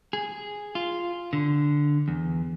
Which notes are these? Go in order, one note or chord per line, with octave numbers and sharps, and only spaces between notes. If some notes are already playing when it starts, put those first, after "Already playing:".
G#4
F4
D3
E2